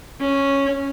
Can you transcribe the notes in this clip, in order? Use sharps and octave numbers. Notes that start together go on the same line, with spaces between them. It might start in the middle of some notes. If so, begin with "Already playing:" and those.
C#4